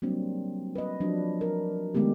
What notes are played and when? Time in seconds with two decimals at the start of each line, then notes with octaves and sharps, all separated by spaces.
0.02 F#3 G3 A#3 C4 D4
0.75 B4 D#5
1.00 F3 F#3 D4
1.41 A#4
1.95 D#3 G#3 A3 B3 G4